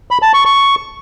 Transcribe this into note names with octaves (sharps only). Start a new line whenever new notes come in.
B5
A5
C#6
C#6